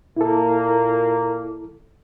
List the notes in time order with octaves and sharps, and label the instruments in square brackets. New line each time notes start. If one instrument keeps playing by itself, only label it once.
[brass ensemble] A#2 A#3 [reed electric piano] E4 A4